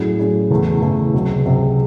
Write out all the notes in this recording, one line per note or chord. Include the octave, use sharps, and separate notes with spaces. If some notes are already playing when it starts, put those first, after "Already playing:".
Already playing: A2 F#3 C#4 G#4
A2 F#3 C#4 G#4
E2 C#3 E3 A3
E2 C#3 E3 A3
C#2 C3 F#3
C#2 C3 F#3